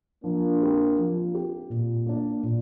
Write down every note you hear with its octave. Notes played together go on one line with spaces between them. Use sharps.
F3 A#3 D4
C4 G4
F3
C4 G4
A#2
A#3 D4
A#2